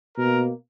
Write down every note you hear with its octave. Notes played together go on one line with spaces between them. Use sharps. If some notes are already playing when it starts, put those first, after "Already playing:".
B2 A#3 A#4